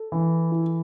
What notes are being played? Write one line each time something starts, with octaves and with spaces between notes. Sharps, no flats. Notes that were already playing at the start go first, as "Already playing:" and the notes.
Already playing: A4
E3
E4